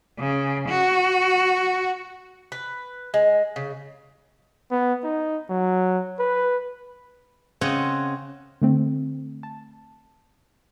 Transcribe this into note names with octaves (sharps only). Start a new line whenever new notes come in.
C#3
F#4
B4
G#3
C#3
B3
D#4
F#3
B4
C#3 C4 D#5 F#5
D3 A3 C4
A5